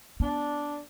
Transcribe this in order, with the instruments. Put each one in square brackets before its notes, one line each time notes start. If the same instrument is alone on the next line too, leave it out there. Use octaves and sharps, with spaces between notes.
[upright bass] B3 [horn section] D4